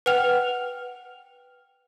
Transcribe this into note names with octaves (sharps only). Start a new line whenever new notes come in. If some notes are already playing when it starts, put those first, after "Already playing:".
B4 F#5 G5 F6 F7